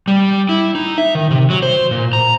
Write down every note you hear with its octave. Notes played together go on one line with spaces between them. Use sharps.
G3
E4
D#4
E5
D#3
C3
F#3
C5
A#2
A#5